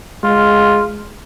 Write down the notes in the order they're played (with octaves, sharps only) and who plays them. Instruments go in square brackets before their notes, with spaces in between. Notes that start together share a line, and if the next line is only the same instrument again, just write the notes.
[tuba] G#3 [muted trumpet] F4